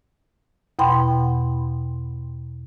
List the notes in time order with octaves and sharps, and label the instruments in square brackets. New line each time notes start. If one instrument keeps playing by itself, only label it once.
[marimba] E2 B2 F#5 G5 B5 C6